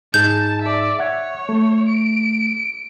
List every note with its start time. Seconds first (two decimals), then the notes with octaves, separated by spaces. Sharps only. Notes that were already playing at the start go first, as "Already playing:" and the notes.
0.14 G#2 D#4 G#4 A5 G6
0.62 D5 E5
0.99 C#5 E5 F#5 G#6
1.49 A3
1.89 D7